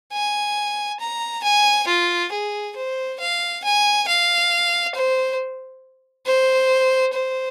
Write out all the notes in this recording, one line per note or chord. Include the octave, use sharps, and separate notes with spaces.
G#5
A#5
G#5
F4
G#4
C5
F5
G#5
F5
C5
C5
C5